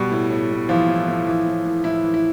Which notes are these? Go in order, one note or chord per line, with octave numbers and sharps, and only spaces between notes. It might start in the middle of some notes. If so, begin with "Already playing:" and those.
Already playing: B2 G3
A2
A2
A2
E3 F3
A2
A2
E3
A2
A2
A2 E4
E3
E4